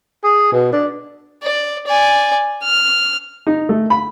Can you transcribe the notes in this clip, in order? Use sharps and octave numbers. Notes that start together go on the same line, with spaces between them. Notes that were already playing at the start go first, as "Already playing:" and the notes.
G#4
B2
D4
D5
D5 G#5
F6
D#4
A3
B5